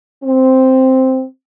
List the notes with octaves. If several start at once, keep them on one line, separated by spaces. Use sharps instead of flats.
C4